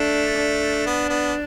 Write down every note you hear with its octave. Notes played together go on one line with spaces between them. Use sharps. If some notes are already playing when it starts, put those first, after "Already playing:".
Already playing: A3 D4
D4
B3
B3